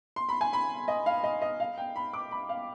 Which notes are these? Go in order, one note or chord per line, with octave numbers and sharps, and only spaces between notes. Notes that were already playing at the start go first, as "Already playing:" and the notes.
C6
B5
G#5
B5
D#5
F5
D#5
D#5
F5
G5
B5
D6
B5
F5